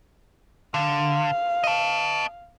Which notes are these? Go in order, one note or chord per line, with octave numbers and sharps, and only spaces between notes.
D3 F5
D#5 A5